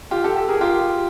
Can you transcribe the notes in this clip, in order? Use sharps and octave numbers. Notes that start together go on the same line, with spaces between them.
F4 G4
G4 A4
G4 A4
G#4 A#4
F4 G4